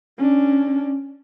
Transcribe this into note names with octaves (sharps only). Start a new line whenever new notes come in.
C#4 D4